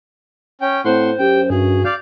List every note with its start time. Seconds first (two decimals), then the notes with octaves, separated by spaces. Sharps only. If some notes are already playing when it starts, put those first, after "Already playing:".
0.61 C#4 G5
0.85 A2 C4 C5 F#5 C6
1.19 F#2 G4 G5
1.50 G2 F#4 G#4
1.85 D5 F5 G6